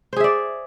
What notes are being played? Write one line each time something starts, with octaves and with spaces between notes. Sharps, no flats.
G#4 C5 D5 E5